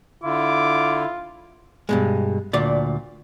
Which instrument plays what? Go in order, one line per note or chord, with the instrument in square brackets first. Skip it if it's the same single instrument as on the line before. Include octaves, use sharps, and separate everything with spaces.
[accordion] D3 [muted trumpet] E4 [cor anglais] F4 [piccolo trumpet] D6
[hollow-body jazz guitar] G2 B2 G#3
D2 A#2 D5